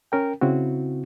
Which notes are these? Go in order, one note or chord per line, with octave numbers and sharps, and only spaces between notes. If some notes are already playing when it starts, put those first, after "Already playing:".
C#4 A#4 G5
C#3 C4 E4 F#4